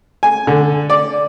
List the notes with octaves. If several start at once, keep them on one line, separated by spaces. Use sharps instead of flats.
G#5
D3
D5